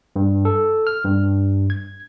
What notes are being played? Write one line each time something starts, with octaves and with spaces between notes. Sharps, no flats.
G2
A4
F6
G2
G#6